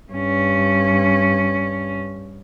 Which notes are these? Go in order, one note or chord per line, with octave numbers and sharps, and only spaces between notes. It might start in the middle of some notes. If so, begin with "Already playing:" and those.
G2 C#4